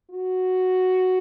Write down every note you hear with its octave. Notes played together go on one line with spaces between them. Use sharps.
F#4